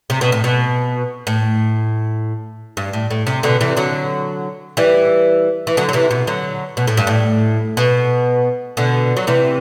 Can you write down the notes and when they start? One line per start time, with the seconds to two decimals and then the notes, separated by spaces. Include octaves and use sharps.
0.10 C3
0.21 B2
0.32 A2
0.44 B2
1.27 A2
2.77 G2
2.93 A2
3.10 A2
3.27 C3
3.43 B2 D3
3.61 C3 E3
3.77 D3 F#3
4.77 E3 G3
5.67 E3
5.77 D3 F#3
5.89 F#3
5.93 C3 E3
6.11 B2
6.27 D3 F#3
6.77 B2
6.87 A2
6.97 G2
7.07 A2
7.77 B2
8.77 B2 D3
9.17 F#3
9.27 C3 E3